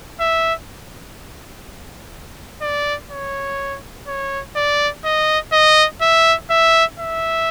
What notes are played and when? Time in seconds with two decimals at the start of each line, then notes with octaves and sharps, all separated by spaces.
0.20 E5
2.61 D5
3.11 C#5
4.07 C#5
4.56 D5
5.05 D#5
5.53 D#5
6.01 E5
6.50 E5
6.99 E5